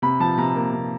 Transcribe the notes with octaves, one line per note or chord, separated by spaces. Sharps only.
C3 B5
F3 A5
C3 A#5
A#3
C3